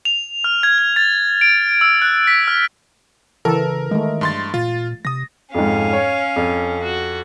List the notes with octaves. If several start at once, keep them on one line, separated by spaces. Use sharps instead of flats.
F7
F6
G#6
G#6
A6
D7
E6
F#6
B6
F6
C#3 E3 A4 A#4
D#3 G#3 A3
G2 C6 A6
A#2 F4
C3 D#6 A#6
F2 G#2 C#4 F5
C#5
F2
F#4